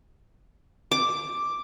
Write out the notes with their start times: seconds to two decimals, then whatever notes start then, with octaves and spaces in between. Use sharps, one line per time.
0.92 D6